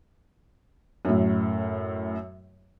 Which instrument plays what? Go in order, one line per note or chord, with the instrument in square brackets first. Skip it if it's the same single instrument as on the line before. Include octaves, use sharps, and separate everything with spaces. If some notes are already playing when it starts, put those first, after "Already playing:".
[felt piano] F#2 A2